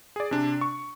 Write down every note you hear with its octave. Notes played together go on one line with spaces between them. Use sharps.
G#4 D5
C3 D4
C#6